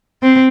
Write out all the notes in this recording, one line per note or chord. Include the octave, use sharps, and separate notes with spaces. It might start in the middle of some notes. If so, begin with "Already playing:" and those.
C4